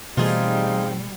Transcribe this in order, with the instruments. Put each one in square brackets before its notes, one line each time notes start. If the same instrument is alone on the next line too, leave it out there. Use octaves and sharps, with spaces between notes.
[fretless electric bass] B2 E3 A3 [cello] G3 [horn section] C4 D#4 [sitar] F4 G#4